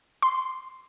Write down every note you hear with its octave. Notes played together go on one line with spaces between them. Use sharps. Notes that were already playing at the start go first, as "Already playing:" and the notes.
C6